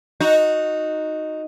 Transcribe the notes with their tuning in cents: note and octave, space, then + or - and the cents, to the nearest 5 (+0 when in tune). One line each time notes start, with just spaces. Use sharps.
D#4 +0 F#4 -10